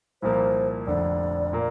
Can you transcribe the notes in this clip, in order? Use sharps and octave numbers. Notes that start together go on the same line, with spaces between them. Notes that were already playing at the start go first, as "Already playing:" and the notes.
C2 A#2 F3 A#3 C5
F1 F2 D3 D5
A#2 A#3